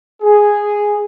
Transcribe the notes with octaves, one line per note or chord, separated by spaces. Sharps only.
G#4